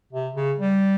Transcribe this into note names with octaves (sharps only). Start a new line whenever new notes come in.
C3
C#3
G3